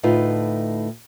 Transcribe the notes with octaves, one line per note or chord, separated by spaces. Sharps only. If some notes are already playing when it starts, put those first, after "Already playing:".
D2 A2 D#4 F4 B4